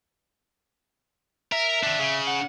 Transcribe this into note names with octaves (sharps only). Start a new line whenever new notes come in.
A#4 E5
D#3 D4
C#3
F#5